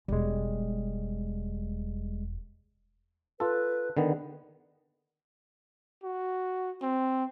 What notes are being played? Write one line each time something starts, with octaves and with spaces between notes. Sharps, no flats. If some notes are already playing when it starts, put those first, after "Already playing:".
E1 G3 G#3
F4 A4 B4
D3 D#3 B3
F#4
C4